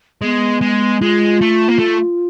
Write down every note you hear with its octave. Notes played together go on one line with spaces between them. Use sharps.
G#3 B3
G#3
G#3 F4
A3
A#3
A3